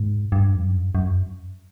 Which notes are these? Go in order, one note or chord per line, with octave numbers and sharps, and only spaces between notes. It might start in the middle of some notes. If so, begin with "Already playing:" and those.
Already playing: G#2
G2
F2
F#2
F#2